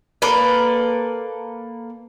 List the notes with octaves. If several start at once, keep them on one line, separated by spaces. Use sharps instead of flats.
A#3 A4 B4 D5